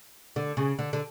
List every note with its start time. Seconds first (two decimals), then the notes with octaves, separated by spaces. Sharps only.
0.36 D3
0.57 C#3
0.79 D3
0.93 D3